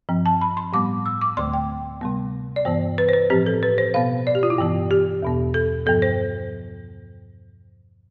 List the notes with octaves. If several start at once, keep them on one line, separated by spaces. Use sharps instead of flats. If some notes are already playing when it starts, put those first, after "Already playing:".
G2 F3 C4
A5
B5
C6
A2 G3 B3 D6
E6
D6
D2 D3 A3 C6
G5
C3 G3 B3
D5
G2 E3 B3 C5
B4
C5
B4
A2 F3 C4 G4
A4
B4
C5
B2 B3 F5
D5
G4
F4
E4
G2 E3 B3
G4
E2 B2 B3
A4
G2 F3 B3 A4
C5